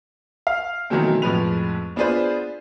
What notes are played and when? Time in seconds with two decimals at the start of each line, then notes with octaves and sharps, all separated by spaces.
0.47 F5
0.90 B2 D#3 E3 F#3 A3 C4
1.22 F2 A2 F3 G#3 B4 F7
1.96 B3 D4 F4 G#4 B4 C5